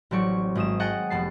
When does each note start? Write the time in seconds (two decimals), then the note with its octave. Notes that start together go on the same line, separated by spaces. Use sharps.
0.11 A1 F#3 A3 C4 D5 C#6
0.55 G#1 D#6 E7
0.80 G#4 D#5 F#5 G5 A5
1.10 F1 B3 A5 C7